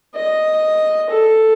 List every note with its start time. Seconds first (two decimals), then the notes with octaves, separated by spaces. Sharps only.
0.15 D#5
1.09 A4